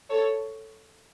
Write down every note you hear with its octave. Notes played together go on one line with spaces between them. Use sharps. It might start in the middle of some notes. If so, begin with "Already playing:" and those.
A4 C#5